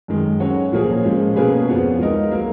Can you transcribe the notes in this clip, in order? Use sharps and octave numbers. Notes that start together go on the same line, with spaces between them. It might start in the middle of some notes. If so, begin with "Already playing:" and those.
F#2 D#3 G#3
F#3 C#4 F#4 C#5
A#2 F3 A#3 C#4 G#4
A#2 F3 G#3 C#4
B2 A#3 C#4 G#4 B4
F2 F3 B3 F#4
F3 G#3 D#4 A#4 D#5
F#3 A#3